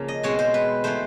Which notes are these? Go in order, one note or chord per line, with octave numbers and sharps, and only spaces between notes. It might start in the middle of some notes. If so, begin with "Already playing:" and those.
Already playing: C#3 F3 A#3
D#5
B2 G#3 C4 C#5
C5
B4
E3 A3 C5